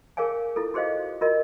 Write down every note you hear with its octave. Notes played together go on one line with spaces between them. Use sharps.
G#4 A#4 C#5 F5 G#5
E4 F4 A4
F#4 G#4 C5 D#5 F5
F4 F#4 A#4 D#5